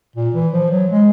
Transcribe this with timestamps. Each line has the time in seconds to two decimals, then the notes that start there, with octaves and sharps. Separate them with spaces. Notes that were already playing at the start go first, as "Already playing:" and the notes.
0.16 A#2
0.34 E3
0.53 F3
0.71 F#3
0.90 G#3